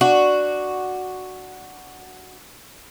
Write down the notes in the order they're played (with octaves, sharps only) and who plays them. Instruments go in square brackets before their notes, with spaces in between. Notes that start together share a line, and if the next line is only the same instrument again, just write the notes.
[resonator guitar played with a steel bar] D4 [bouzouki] F#4